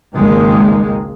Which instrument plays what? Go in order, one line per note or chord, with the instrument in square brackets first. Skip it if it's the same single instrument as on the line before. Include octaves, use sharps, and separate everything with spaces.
[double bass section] G#1 C#2 D#3 G#3 A#3